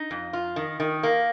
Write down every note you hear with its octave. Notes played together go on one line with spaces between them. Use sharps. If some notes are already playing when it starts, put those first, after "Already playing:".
Already playing: D#4
F2
F4
D#3
D#3
A#3